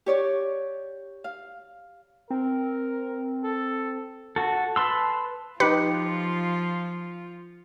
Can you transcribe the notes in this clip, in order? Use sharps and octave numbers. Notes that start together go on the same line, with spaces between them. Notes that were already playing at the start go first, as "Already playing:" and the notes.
G4 C#5 D5
F5
C4 A#4
A4
F#4 A4
B4 A5 C6 E6
F3 D#4 F4 G4 B4 C#7